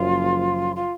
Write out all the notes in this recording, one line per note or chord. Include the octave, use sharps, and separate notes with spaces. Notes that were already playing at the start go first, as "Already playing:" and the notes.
Already playing: F#1 F#2 F3 F4
F4